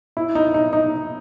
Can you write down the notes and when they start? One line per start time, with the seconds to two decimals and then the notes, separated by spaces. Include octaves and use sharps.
0.17 E4
0.35 D#4
0.54 D#4
0.73 D#4